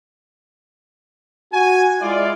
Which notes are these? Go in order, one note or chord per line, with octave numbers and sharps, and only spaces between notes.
F#4 G#5
G#3 E4 F4 D5